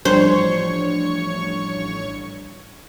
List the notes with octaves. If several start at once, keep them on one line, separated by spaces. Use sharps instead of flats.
A1 F3 G3 D4 C5 C#5 C#6